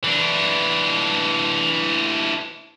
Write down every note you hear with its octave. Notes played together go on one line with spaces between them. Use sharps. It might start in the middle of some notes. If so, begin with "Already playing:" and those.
E3 D4